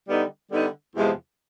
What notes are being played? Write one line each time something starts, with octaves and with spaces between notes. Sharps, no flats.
D3 G3 B3 D#4
D3 G3 B3 D#4
E2 C3 F3 G#3